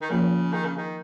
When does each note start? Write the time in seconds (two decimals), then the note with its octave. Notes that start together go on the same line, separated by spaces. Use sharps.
0.02 D#3
0.10 C#3 F3 A#3 F4 A#4 C#5
0.53 D#3
0.64 C#3
0.77 D#3